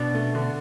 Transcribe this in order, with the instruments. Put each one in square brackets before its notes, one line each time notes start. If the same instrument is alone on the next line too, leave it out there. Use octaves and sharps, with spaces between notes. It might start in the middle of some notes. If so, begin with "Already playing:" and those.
Already playing: [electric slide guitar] B2 [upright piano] D4
[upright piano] A3
D3